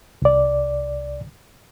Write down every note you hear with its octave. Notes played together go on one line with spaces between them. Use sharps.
C2 D5